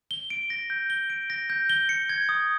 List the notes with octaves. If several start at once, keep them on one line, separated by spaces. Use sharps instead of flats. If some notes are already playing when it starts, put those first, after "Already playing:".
G7
D7
A#6
G6
G7
D7
A#6
G6
G7
C#7
G#6
D#6